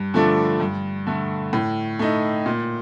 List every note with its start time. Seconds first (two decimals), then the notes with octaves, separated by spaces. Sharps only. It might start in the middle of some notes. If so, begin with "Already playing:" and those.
Already playing: G2
0.14 D3 F3 A3 D4
0.60 G2
1.07 D3 A3
1.53 A2
1.99 A3 D#4
2.46 A#2